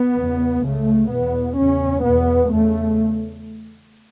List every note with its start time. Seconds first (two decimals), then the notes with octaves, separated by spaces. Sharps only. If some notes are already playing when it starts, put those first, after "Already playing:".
Already playing: B3
0.16 E2 C#3
0.62 C#2 C#3 A3
1.10 E2 B2 B3
1.57 E2 C#3 C#4
2.03 E2 B2 B3
2.51 E2 C#3 A3